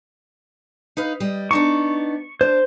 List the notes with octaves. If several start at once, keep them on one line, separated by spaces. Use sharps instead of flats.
D#4 B4 F5
G3 D#5
B3 D4 D#4 C#6
D4 C5